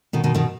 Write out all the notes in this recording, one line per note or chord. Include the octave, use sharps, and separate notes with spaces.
B2 D#3
B2 D#3
B2 D#3